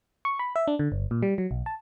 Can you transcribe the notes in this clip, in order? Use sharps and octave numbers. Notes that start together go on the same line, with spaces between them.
C#6
B5
E5
D4
D3
G1
A#2
G3
F#3
B1
A5